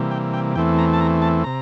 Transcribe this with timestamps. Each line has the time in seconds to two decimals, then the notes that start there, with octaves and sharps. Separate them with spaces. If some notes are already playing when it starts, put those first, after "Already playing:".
Already playing: C3 E3 G3 A#3
0.11 G5
0.34 G5
0.56 E2 E3 A3 C4 G5
0.79 A#5
0.93 A5
1.01 A#5
1.22 A5
1.44 C3 A#5